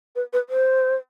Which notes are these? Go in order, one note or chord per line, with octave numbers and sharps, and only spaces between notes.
B4
B4
C5